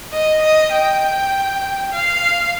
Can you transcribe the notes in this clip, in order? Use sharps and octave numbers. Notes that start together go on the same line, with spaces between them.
D#5
D#5
G5
F5